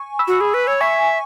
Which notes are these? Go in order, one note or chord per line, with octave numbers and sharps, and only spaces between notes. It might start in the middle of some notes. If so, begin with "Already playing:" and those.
Already playing: G#5 C#6
B5 E6
F#4
G#4
B4
C#5
E5 G#5 C#6